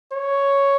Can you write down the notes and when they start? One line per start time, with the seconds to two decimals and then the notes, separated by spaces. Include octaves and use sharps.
0.12 C#5